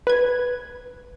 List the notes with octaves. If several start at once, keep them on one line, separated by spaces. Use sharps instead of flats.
B4 G#6